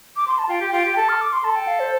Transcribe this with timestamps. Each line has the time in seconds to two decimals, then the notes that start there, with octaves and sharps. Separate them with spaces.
0.16 D6
0.28 C6
0.38 A5
0.49 F4 G5
0.61 G4
0.73 F4 G5
0.85 G4
0.96 A4 A5
1.09 F6
1.21 D6
1.33 C6
1.44 A4 A5
1.56 G5
1.67 F5
1.80 C5